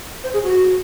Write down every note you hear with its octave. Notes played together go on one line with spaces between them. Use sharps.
C5
G#4
F#4